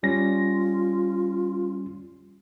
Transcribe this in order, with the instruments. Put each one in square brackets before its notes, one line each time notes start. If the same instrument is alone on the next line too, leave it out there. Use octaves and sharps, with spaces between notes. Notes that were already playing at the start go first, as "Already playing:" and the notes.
[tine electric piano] G3 C#4 A#6 [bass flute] F4